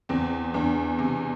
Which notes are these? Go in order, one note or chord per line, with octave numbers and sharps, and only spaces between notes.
E2 C4
E2 D4
C3